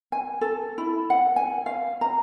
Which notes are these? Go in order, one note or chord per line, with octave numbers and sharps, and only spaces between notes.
G#5
A4
E4
F#5
G#5
F5
A#5